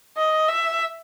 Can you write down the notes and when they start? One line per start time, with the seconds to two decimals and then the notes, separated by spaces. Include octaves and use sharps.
0.17 D#5
0.48 E5